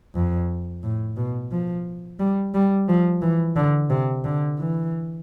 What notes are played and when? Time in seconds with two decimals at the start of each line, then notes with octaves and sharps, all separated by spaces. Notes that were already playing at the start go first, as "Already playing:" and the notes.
0.15 F2
0.83 A2
1.17 B2
1.52 F3
2.19 G3
2.54 G3
2.88 F3
3.21 E3
3.56 D3
3.90 C3
4.24 D3
4.58 E3